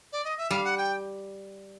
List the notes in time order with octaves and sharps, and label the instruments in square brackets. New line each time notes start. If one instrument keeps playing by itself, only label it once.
[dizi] D5
D#5
E5
[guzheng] G3 [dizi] F5
[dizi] F#5
G5